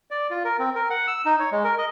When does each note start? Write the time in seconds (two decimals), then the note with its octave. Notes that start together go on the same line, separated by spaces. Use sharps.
0.11 D5
0.30 F4
0.44 A#4
0.59 C4
0.75 A#4
0.90 F#5
1.07 E6
1.25 D#4
1.39 C#5
1.52 G#3
1.64 A#4
1.78 D#5